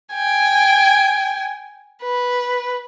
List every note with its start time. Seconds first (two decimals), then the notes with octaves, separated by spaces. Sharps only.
0.14 G5 G#5
2.03 B4